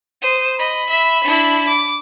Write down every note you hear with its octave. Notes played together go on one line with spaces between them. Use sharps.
C5 D#6
D#5 B5
E5
D4 E4
D6